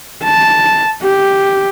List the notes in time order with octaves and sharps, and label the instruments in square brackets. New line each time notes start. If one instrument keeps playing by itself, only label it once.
[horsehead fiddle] A5
G4